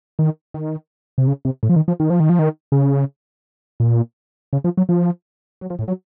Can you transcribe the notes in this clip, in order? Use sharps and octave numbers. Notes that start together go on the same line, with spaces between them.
D#3
D#3
C3
C#3
C3
A2
F3
D#3
F3
D#3
F3
D#3
F3
D#3
C#3
A#2
C#3
F3
F#3
F3
F#3
F3
A2
F#3